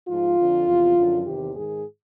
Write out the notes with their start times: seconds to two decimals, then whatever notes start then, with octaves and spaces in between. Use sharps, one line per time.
0.09 G#2 F3 F4
0.37 F2 D3 F3
0.66 E2 C3 F3
0.96 F#2 D3 F3
1.25 E2 C3 D#3 G4
1.54 G#2 D#3 G#4